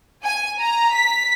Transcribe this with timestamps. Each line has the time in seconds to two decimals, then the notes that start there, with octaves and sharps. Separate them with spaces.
0.24 G#5
0.59 A#5
0.94 B6